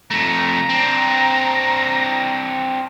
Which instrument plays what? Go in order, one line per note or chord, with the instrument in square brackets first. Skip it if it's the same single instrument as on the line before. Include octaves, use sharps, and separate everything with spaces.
[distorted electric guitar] F2 A3 [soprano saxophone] A#5
[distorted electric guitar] C4 D4